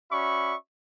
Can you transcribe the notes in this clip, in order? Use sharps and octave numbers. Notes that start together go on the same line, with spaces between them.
C#4 F#4 D5 E5 B5 C#6